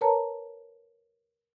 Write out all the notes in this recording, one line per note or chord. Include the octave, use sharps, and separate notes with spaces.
A#4 B4 C#5 A5 A#5